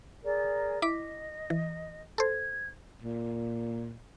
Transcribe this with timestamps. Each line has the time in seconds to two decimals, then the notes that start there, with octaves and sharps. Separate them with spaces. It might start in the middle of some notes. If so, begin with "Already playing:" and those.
0.23 G#4 A#4 D5
0.82 E4 D#5 D6 B6
1.50 E3
2.18 A4 C5 G#6
3.02 A#2